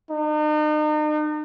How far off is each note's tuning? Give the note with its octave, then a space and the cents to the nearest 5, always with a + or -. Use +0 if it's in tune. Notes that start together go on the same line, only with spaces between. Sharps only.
D#4 -40